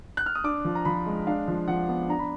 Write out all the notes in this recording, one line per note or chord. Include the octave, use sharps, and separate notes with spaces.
F#6
F6
D#6
D4 D6
F3
A#5
F3 B5
G#3
D4 F5
F3
F3 F#5
B3
D4 A#5
B5